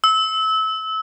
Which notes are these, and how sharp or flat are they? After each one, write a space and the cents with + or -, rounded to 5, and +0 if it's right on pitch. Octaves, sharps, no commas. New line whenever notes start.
E6 -25